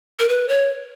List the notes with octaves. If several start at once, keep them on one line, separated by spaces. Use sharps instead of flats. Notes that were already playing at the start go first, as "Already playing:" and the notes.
A#4
B4
C#5